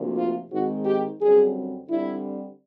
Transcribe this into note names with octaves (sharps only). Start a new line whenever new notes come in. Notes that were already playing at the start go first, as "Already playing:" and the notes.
Already playing: D2 C3 F3 A#3
F4
G#2 D#3 G#3 C4 D#4 F#4
G4
F#2 D3 G3 C4 G#4
D3 G3 C4 E4